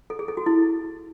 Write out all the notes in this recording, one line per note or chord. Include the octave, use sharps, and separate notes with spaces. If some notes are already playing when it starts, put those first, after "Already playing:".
A4
G#4
A4
F#4
E4